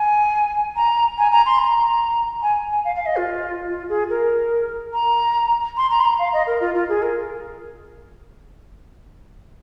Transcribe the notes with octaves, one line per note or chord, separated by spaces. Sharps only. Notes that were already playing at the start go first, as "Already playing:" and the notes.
Already playing: G#5
A#5
G#5
A#5
C6
A#5
G#5
G#5
F5
F5
D#5
F4
F4
G#4
A#4
A#5
C6
A#5
C6
A#5
F5
D#5
A#4
F4
F4
G#4
A#4